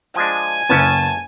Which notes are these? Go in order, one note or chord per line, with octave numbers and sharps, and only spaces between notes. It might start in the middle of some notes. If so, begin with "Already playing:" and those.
F3 G#3 D4 G#5
F#1 B3 C#4 E4 A5